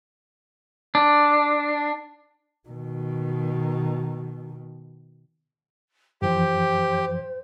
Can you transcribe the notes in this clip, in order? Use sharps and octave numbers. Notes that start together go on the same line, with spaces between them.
D4
B2 D#3
F#2 E3 F3 G4 C5